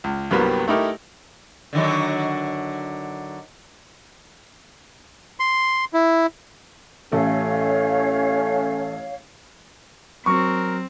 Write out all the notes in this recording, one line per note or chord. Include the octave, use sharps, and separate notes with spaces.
C#2
C2 G2 F#3 G3 A#3 B3
A3 D#4 E4 G4 A#4
D3 D#3 F#3
C6
E4
A1 A3 C#4 A4 C#5 F5
F#3 C4 A#4 C#6